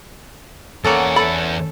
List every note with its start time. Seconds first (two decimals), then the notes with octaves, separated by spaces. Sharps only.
0.84 E2 A#3 C#4 A4 F#5
1.16 A4 B5